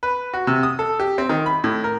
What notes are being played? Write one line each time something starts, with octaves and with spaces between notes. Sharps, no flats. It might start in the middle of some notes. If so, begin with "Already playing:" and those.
B4
F#4
C3
D#6
A4
G4
C4
D#3
B5
A2
A#4